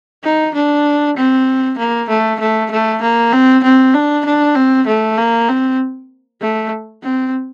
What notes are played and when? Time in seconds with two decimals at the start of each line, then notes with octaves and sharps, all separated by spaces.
0.24 D#4
0.55 D4
1.17 C4
1.78 A#3
2.09 A3
2.40 A3
2.71 A3
3.02 A#3
3.33 C4
3.64 C4
3.94 D4
4.25 D4
4.56 C4
4.87 A3
5.18 A#3
5.48 C4
6.42 A3
7.03 C4